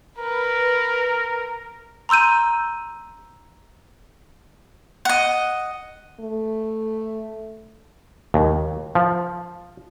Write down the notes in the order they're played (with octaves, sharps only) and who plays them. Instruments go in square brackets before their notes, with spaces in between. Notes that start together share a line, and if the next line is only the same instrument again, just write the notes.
[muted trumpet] A#4 [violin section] B4
[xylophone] A#5 C6 E6 G6 D#7
[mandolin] D#5 F#5
[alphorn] A3
[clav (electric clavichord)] D#2
F3